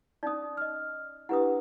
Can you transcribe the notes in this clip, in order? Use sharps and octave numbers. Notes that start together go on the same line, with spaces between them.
C#4 D#4 D5 D#6
D#5 F6
D4 E4 G4 B4 F#5 D#6